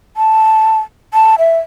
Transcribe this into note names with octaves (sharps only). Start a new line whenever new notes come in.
A5
A5
E5